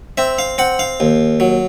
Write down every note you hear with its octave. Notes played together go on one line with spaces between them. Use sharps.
C4 E5
F5
C4 F#5
F5
D#2
F#3